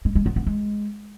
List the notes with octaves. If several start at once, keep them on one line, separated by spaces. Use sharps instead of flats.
G#3
G#3
B3
B3
G#3